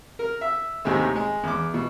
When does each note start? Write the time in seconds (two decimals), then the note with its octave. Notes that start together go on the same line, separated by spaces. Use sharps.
0.19 A#4
0.41 E5
0.85 D#2 A2 C3 G#3 A3
1.16 G#3
1.43 E2 D6
1.74 B2